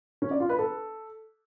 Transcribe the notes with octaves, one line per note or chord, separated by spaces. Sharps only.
C#4
D5
F4
B4
A4